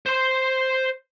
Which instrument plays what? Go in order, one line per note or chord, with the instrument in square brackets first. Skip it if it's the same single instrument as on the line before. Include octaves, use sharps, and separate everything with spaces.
[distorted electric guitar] C5 C6